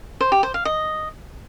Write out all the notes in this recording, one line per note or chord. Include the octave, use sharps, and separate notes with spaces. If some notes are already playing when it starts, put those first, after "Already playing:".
C5
G4
C5
F5
D#5